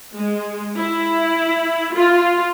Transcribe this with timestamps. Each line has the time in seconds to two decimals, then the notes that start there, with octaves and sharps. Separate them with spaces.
0.17 G#3
0.77 E4
1.94 F4